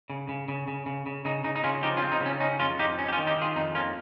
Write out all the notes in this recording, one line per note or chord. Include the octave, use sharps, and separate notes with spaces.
C#3
C#3
C#3
C#3
C#3
C#3
C#3 D#4
C#3 D#4
D#4
C#3 C#4 F4
F3 D#4 G4
C#4 F4
C4
D#4
C#3
C#4
C#4 D#4
F2 C#4 F4
F2 D#4 G4
C#4
G4
C#4 F4
D#3
D#4 G4
D#3
F4 G#4
F2 D#4
A#3 C#4 F4